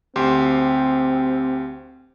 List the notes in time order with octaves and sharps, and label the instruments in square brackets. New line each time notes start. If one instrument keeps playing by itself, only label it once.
[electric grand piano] D2 G4 C6 [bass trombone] C4